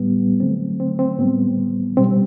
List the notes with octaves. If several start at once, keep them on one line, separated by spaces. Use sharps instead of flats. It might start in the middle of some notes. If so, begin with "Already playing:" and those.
Already playing: A2 G3 B3
D3 F#3 A3 C4
C4
C4
A2 G3 B3
B2 G3 C4